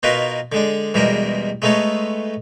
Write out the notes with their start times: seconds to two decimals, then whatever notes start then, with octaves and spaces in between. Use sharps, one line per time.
0.03 B2 D#4 F4 F#4 A#4 B4
0.52 D3 G#3 D4
0.94 E2 B2 G3 G#3 A#4
1.62 G#3 A3 B3 D#4 A4 C#5